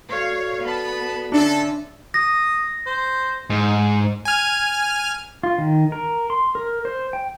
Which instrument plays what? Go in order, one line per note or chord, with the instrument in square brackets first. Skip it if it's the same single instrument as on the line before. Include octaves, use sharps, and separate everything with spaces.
[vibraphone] F#4 A4 D5 [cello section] C#5 F5
[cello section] B3 [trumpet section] A5 B5
[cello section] D3 C#4 [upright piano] D4 [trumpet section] A4 [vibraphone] E5
[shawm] D#6 [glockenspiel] A#6
[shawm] C5
[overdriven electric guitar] G#2
[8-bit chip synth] G#5 F6
[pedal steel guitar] F4
D#3
A#4
C6
A#4
C5
G5